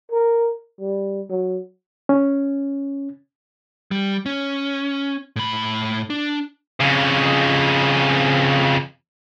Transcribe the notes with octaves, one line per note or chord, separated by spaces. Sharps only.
A#4
G3
F#3
C#4
G3
C#4
A2 B5
D4
F2 C#3